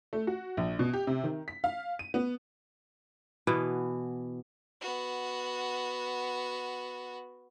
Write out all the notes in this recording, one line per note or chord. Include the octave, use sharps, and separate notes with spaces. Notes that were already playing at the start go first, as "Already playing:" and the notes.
A3
F#4
A#1
B2
G4
C3
D#3
B6
F5
D#7
B3
B2 E3 B3
B3 F#4